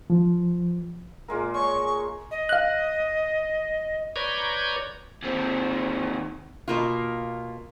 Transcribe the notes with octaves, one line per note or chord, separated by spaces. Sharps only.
F3
A#2 G#3 A#4
C#5 C#6
D#5
F5 F#6
B4 C#5 D5 A#5 G6 G#6
D#2 C4
B2 A#3 F4